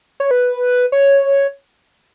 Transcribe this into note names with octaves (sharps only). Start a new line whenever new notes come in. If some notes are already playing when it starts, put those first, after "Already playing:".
C#5
B4
C#5